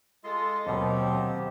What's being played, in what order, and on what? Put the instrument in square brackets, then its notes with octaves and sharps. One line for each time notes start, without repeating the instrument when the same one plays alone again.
[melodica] G#3 F4 C6 [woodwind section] A4 D#5
[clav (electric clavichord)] D#2 B2 [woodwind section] D#3 F#3 [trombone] C4 [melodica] G4